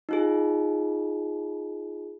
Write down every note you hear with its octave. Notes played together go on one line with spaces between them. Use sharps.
D#4 F4 G#4